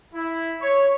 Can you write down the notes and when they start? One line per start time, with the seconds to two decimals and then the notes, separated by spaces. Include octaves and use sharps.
0.14 E4
0.62 C#5